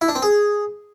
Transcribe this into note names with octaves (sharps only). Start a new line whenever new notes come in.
E4
D4
C4
G#4